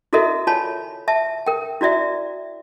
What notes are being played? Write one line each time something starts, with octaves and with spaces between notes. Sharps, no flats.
E4 F#4 A4 A#4 D#5 E5
F4 C#5 G#5 A5 B5
E5 A5
A#4 G5
E4 F#4 D5 E5